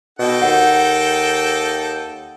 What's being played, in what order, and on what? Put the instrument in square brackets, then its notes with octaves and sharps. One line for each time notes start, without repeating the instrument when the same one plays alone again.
[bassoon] B2 [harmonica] D#4 A4 G5
[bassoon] D#2 [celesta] F#5